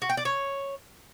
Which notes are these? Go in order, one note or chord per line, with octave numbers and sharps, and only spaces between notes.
F#4
G5
D5
C#5